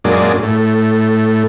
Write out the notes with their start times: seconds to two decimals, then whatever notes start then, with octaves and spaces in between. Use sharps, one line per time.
0.04 F#2 A#2 G#3 D4
0.43 A2